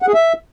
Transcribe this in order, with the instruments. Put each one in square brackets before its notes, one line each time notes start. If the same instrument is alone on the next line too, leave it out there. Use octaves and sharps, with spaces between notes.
[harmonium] F#5
G#4
E5